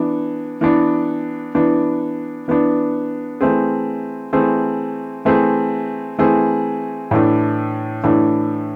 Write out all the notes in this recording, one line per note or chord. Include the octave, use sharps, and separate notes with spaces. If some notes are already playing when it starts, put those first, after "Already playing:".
Already playing: E3 B3 D4
E3 B3 D4
E3 B3 D4
E3 B3 D4
E3 A3 C4 G#4
E3 A3 C4 G#4
E3 A3 C4 G#4
E3 A3 C4 G#4
A2 E3 A3 D4
A2 E3 A3 D4